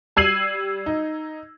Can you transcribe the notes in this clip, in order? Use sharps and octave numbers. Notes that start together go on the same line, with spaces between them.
G3 E6 G#6 C7 D#7 F#7
D#4